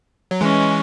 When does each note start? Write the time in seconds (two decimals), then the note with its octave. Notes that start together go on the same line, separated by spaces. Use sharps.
0.31 F#3
0.41 E3 G#3 C#4